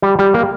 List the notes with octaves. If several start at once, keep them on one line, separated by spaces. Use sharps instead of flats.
G3
G3
A#3